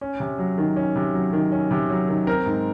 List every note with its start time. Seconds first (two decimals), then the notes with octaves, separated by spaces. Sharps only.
0.01 C#4
0.20 C3
0.38 F#3
0.58 D#3
0.76 C#4
0.95 C3
1.14 F#3
1.33 D#3
1.52 C#4
1.71 C3
1.90 F#3
2.09 D#3
2.27 C4 A#4
2.46 G#2